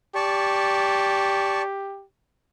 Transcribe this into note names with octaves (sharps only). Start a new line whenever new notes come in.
G4 D5 A5 C#6